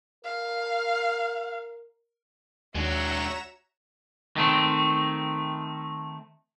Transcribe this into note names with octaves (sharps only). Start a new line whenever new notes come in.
A#4 F5
D#2 G#3 D4 F#4 C#5 E5 A#5 E7
D#3 A3 C4